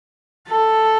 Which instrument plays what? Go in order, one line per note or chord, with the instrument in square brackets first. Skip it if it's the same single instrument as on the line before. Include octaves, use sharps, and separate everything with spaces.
[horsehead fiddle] A4